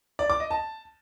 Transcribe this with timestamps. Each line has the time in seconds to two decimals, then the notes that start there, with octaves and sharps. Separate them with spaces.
0.19 D5
0.30 D6
0.40 D#5
0.51 A5